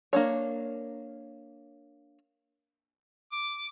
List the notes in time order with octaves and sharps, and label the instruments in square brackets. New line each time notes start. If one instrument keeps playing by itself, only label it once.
[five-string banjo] A#3 D4 C#5
[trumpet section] D6